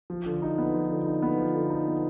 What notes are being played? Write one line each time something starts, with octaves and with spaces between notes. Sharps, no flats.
F3
D3
D#4
B3
F3
D3
D#4
B3
F3
D3
D#4
B3